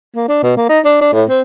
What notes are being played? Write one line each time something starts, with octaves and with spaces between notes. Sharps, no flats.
A#3
D4
B2
A#3
D#4
D4
D4
A2
C4